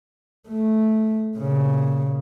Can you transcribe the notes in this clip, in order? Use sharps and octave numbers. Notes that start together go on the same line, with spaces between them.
A3
A#2 C#3